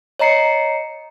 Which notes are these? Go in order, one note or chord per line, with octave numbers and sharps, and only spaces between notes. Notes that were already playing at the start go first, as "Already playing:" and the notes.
C#5 D#5 A#5 C7 C#7